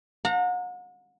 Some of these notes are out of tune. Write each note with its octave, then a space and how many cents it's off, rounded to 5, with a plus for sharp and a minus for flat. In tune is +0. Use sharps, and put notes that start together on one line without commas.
F#5 -40 A#5 -25